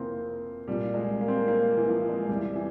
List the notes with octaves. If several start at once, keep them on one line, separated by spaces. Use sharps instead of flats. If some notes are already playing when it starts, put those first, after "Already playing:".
Already playing: F2 C3 E3 A#3 C4
C2 A#2 G3
G#3
A#3
C4
A#3
A#3
E3
F3
G#3
E2 C3 E3 G3
E3